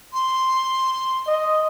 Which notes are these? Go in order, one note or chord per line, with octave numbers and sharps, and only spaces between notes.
C6
D#5